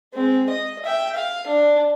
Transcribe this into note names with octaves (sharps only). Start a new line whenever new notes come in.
G#3 C4
D#5
E5 G5
F5
D4